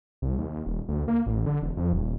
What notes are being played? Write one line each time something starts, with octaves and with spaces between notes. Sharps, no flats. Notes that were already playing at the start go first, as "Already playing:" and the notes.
C2
D#2
D#1
D2
A#3
A1
D3
E1
F2
D#1